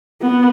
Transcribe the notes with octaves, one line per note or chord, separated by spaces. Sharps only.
B3